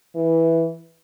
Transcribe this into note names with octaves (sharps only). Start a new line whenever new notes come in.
E3